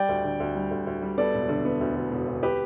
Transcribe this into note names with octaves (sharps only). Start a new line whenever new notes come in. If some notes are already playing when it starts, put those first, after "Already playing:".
Already playing: G3 D5 G5
D2
D3
D2
G3
D2
D2
G3
B3 A4 D5
E1
D3
B3
D2
D2
E1
D2
G4 B4